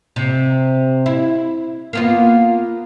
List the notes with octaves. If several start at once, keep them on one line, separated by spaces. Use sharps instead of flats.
C3
E4
A#3 B3 F4